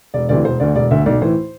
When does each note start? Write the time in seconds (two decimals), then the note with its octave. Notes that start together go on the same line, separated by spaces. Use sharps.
0.14 E1 D5
0.29 D2 C3 E3 D5
0.45 E1 C5
0.60 D2 D3 D5
0.76 E1 D5
0.90 D2 D3 E5
1.06 B1 D5
1.21 A2 E3 C5